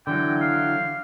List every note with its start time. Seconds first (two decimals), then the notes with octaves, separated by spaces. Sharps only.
0.07 D3 E3 F#3 G5
0.41 F5